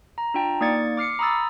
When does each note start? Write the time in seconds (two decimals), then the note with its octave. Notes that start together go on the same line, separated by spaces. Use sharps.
0.18 A#5
0.34 D4 F4 G5 A5 A#5
0.61 A#3 D#4 D5 G#6 A6 C#7
0.97 D6 F6 C7 C#7
1.19 A#5 B5 D#6 E6 A6